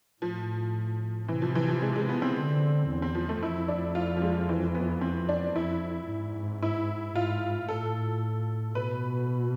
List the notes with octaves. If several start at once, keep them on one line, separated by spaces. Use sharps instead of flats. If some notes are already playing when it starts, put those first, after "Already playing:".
A2 F3
C3 E3
F3
E3
F3
G#3
G#3
B3
C4
D3
E2
C4
F3
A3
F2 E4
D4
F4
F3
G#3
E3
B3
C4
D4
F2 E4
G#2
E4
G#2 F4
A2 A4
B2 B4